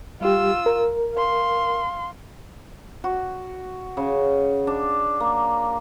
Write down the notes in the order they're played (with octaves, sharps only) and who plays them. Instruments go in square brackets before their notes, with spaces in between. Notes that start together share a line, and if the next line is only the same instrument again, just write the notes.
[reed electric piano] G3 G4 [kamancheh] F4 E6
[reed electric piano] A#4
[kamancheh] F5 C6
[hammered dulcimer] F#4
C#3
D4
A#3